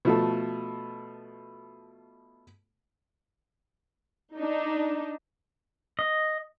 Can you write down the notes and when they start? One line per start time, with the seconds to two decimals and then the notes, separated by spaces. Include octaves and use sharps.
0.05 B2 F3 A3 A4
4.37 D4 D#4
5.99 D#5